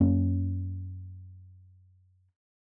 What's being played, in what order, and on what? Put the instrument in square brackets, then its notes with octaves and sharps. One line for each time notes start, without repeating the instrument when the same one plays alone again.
[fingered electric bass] F#2 A#3 C#4